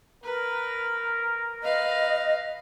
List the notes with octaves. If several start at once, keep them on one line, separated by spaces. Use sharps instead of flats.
A#4 B4
B4 D#5 F5